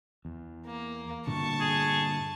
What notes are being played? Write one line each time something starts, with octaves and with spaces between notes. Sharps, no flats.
E2
A#3
G2 A#2 D3 A5 C#6
G#4